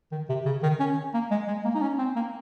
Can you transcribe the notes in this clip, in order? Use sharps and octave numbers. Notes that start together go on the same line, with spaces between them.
D#3
C3
C#3
D#3
C#4
A#3
G#3
G#3
A#3
D#4
C#4
C4
A#3